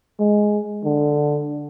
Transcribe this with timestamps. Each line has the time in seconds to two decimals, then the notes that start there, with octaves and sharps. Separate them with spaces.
0.19 G#3
0.84 D3